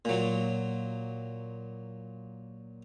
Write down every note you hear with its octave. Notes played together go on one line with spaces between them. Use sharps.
A#2 F#3